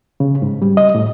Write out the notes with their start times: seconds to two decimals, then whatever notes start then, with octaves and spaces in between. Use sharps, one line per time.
0.20 C#3
0.42 G#2
0.62 G3
0.77 D#5
0.95 A2